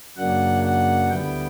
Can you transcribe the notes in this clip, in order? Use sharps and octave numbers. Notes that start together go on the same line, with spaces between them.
F#2 C#3 F#3 A#3 D4 F#5
F#5
D2 D3 G3 B3 E4 G5